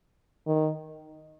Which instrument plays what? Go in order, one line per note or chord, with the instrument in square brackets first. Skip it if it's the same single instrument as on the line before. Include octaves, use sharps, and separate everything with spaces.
[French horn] D#3